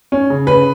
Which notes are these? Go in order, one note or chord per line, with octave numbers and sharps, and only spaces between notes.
C#4
C#3
C#3 B4